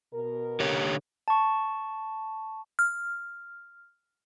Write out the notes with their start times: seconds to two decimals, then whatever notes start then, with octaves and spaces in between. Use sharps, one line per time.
0.12 B2 A#4
0.60 D3 G4 C#5
1.28 A5 C#6
2.79 F6